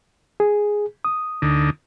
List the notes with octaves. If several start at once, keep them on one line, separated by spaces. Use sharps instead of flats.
G#4
D#6
D2 D3 D#4